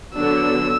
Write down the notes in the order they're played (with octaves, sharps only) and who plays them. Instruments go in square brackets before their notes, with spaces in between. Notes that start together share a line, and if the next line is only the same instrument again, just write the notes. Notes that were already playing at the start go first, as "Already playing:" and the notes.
[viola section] D3 F#3 B3 D4 [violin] E6